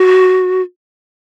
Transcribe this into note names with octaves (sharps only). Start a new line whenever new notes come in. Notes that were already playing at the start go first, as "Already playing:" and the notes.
Already playing: F#4